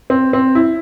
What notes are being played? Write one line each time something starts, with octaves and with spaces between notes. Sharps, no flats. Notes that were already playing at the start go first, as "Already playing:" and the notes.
C4
C4
E4